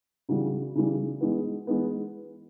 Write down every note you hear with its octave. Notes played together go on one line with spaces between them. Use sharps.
C#3 E3 G3 F#4
C#3 E3 G3
E3 G#3 B3
E3 G#3 B3